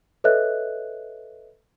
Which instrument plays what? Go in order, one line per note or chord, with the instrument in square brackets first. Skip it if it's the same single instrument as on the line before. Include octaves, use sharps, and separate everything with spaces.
[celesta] A4 B4 C#5 D#5 E5 F#6